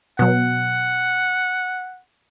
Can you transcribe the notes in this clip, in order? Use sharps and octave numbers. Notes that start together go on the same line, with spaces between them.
B2 F#3 F#5